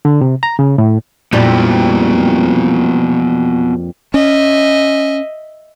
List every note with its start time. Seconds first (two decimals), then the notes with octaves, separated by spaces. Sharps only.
0.05 D3
0.21 C3
0.43 A#5
0.59 C#3
0.78 A2
1.33 F2 A#2 G3 B3 E4 F#4
4.14 C#4 D#5 E5